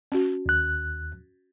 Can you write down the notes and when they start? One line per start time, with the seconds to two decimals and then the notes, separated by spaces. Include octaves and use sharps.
0.12 C#4 F#4
0.46 D#2 F#6